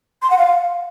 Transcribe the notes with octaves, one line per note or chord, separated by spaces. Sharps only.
C6
F#5
F5